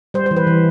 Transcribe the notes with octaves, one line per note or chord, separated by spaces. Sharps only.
G3 C5
E3 C5
B4
E3